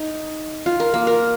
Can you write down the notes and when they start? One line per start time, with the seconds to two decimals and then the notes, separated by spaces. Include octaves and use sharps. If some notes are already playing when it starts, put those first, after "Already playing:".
Already playing: D#4
0.66 F4
0.80 A#4
0.94 A#3
1.07 A#4